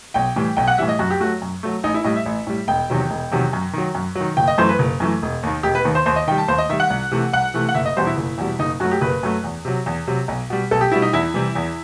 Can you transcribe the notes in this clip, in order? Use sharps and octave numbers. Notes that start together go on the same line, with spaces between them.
B1 G5
A2 E3 G3
B1 G5
F#5
A2 E3 G3 E5
D#5
F#2 F#4
G4
F#3 A3 F#4
F#2
F#3 A3
A1 D#4
E4
A2 G3 D#5
E5
A1
A2 G3
E1 G5
E2 C3 D#3 F#3
E1
E2 C3 D#3 F#3
F#2
D#3 F#3
F#2
F#3
D#3
F#1 G5
D#5
F#2 E3 A3 C5
B4
F#1
F#2 E3 A3
E1
D#2 D#3
E1 G4
B4
D#2 D#3
C5
D#2 C5
D#5
D#3 G3 G5
A5
D#2 C5
D#5
D#3 G3 E5
F#5
C2
C3 E3 A3
C2 F#5
C3 E3 A3
F#5
F#1 E5
D#5
E2 B2 G3 C5
E4
F#1
E2 B2 G3
F#1 D#4
F#2 F#3 A3 F#4
G4
F#1 B4
F#2 F#3 A3
E2
C3 F#3
E2
C3 F#3
B1
B2 G3
B1 A4
G4
B2 G3 E4
D#4
E2 E4
C3 E3 G3
E2